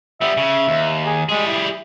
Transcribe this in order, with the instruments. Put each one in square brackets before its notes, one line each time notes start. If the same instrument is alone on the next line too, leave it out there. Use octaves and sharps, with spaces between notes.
[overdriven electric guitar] G3 B3 [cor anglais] E5
[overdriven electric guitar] C#3
D#2
[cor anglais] G#4
[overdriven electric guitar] G3 G#4 [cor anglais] G#3
[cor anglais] E4